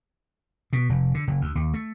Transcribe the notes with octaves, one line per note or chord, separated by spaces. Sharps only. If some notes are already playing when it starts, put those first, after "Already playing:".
B2
F1
D3
F#1
D2
D#2
A3